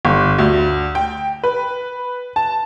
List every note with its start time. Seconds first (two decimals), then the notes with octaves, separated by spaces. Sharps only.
0.05 G1
0.39 D2
0.95 G5
1.44 B4
2.36 A5